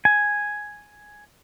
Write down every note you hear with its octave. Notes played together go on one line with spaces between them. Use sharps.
G#5